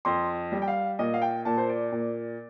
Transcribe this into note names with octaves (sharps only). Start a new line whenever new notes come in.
F2 C6
G3
G5
F5
A#2 D#5
F5
G5
A#2 A5
C5
D5
A#2